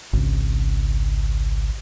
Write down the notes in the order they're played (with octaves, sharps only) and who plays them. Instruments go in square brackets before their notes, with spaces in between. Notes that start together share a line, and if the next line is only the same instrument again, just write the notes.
[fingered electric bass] G#1 C#2 C#3